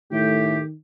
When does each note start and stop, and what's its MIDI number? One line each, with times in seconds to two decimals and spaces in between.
0.12 0.58 45
0.12 0.75 51
0.12 0.59 57
0.12 0.59 67